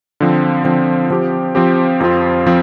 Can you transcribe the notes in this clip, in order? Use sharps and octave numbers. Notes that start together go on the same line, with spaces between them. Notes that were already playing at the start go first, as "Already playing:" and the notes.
D3 F3 C4
D3 F3 C4
F3 C4 G4
F3 C4 G4
F2 F3 C4 F4
F3 C4